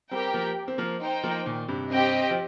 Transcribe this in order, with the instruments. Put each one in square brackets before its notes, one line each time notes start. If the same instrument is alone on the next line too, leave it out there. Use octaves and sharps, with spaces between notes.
[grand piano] G3 C4 [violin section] G4 A#4 G5
[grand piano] F3 A#3
C4
F3 A#3
[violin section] D#4 C5 G5
[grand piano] F3 A#3
A#2 D#3
G2 C3
[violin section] C4 G4 D#5 G5
[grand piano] F3